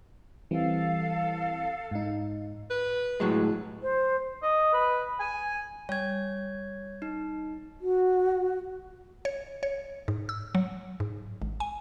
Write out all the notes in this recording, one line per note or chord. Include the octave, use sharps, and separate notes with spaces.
E3 G3 C4 A4 F5
G#2 D#4
B4
A2 F#3 G#3
C5
D#5
B4
G#5
G3 C#5 G#5 G#6
D#4
F#4
C#5
C#5
G#2
E6
F#3
G#2
G#1
G#5